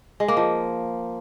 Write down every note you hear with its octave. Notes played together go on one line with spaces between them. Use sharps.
G#3
A#3
F3